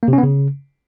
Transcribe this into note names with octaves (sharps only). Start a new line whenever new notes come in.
A#3
C3
C#4
B3
C#3